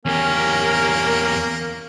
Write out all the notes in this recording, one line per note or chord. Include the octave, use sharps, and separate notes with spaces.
E2 A#3 C#4 G4 A#4